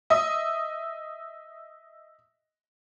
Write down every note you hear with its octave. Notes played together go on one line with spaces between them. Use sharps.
D#5 E5 D#6